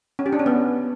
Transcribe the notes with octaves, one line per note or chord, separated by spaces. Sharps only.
C#4
G4
D4
C#4
B3